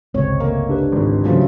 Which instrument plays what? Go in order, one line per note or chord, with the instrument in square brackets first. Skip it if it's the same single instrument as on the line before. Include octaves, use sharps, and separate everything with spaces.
[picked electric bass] G1 C#2 C3 [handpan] G#3 C4 C#5
[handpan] A3 [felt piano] A#3
[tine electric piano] D4 G4 B4
[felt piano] G#1 F2
[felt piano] C#3 F3 [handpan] F#3 A3